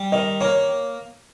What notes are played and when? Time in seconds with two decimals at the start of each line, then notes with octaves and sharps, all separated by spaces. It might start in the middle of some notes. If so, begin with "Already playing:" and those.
Already playing: G3
0.12 D#3 D#5
0.41 A#3 C#5